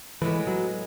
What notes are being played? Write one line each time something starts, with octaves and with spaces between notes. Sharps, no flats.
A2 E3 G#3 B3
F#3